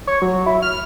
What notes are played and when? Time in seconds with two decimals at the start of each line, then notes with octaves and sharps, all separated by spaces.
0.07 C#5
0.22 F#3
0.46 E4
0.62 F6